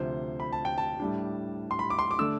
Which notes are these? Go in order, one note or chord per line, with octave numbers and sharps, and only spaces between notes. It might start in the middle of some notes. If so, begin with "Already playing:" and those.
Already playing: D2 C3 F3 C5
B5
A5
G5
A5
A2 G3 D4
C6
B5
D6
C6
D6
D3 A3 D4 E6